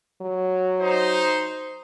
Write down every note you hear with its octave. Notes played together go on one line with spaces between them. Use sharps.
F#3
D#4 C5